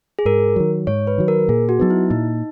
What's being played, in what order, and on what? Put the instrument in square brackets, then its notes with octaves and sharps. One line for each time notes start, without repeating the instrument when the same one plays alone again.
[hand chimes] G#4
[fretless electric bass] G#2 [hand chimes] A#4
[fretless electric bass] D#3 F#3
[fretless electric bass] G#2 [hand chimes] C#5
[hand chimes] B4
[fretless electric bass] D#3 F#3
[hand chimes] A#4
[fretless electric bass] A#2 [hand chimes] G#4
[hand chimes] F#4
[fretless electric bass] F#3 B3 [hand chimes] D#4
[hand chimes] E4
[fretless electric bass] A#2 [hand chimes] D#4